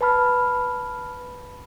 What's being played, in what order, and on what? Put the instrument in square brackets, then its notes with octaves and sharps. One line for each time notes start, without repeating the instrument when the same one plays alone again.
[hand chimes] B4 A5 B5 F6